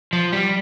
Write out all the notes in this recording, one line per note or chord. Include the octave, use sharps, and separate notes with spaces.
F3
G3